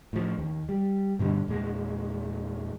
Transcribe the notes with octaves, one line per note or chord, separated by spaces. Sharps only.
A2 F3
D#2
G3
G2 B2 D3 G3
E2 A#2 G#3